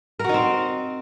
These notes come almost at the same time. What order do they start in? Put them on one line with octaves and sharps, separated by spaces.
A#4 F#4 D#4 C4